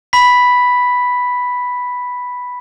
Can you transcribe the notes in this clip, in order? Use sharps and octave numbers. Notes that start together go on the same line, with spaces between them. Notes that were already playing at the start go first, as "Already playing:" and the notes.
B5 B6